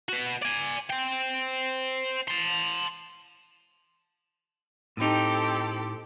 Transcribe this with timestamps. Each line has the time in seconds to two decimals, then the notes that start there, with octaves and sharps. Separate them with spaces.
0.09 F#4 B4
0.42 D5 G#5
0.90 C5 G5
2.28 A5 C6
4.97 A2 C4 D#4 G4 A4